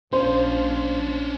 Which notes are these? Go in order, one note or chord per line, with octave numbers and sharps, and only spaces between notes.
A#1 F3 C#4 D4 C5